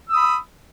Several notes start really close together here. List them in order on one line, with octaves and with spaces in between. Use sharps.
E6 D#6 B5